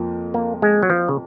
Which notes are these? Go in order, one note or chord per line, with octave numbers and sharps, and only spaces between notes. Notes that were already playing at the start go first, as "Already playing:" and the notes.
Already playing: F2 F3 A#3 F4
A#3
G#3
F#3
F3
C#3